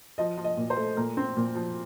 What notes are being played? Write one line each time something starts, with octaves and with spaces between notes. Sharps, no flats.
F3 D#5
F3
D#5
A#2
C5
A3
A#2 A#4
C4
A#2
F3